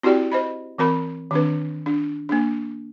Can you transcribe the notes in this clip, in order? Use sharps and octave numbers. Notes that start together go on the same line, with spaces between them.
C4 E4 F#4 G4 D5 G5
C5 D#5 B5
E3 C4 A#4 B5
D#3 C4 D4 B4
D4
A#3 D4